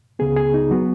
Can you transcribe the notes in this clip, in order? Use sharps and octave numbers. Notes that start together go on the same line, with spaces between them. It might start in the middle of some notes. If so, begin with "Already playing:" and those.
C#2 C#3 B3 G#4
G#4
D#4
F#3 B3 F#4